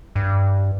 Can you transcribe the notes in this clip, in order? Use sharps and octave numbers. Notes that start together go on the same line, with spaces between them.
G2